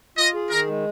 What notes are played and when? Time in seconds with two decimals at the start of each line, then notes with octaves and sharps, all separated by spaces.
0.17 F4 D#5
0.34 G#4
0.50 D#3 A#4
0.68 G#3